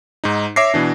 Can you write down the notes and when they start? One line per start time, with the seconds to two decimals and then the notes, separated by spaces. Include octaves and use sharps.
0.24 G#2 D#4
0.56 C#5 E5 D6 A#6 C7
0.74 B2 E3 D4